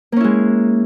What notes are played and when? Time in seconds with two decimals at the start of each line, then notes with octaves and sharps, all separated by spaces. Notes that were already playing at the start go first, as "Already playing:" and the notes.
0.12 A#3
0.16 C#4
0.20 E4
0.24 G#3